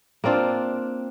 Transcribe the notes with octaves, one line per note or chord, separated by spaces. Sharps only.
A#3 C4 D4 F4